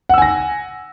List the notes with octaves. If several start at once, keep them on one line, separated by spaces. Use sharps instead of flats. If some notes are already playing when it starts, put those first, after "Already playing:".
F#5 G#5 E6 A#6